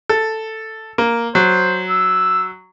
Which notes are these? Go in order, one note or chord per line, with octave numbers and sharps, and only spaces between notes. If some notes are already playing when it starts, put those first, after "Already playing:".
A4
A#3
F#3 C5
E6